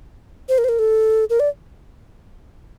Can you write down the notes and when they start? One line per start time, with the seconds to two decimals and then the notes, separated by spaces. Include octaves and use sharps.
0.49 C5
0.58 A#4
0.64 C5
0.69 A#4
0.79 A4
1.30 A#4
1.40 D5